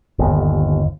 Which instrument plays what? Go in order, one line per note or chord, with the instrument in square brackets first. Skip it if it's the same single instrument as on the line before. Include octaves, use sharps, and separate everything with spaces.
[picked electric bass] G1 D#2